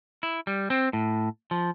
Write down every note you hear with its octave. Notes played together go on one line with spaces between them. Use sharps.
E4
G3
C4
A2
F3